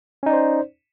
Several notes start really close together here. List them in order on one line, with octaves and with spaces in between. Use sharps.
C#4 D#4 D5 C5